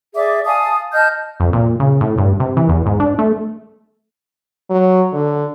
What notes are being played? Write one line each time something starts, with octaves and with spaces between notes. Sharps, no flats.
G#4 D5 E5 D6
F5 G#5 A5 D#6
D#5 A5 F6 G6
F2
A#2
C#3
A2
G2
C3
E3
E2
G#2
D4
A3
F#3
D3